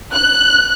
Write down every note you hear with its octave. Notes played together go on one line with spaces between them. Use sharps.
F#6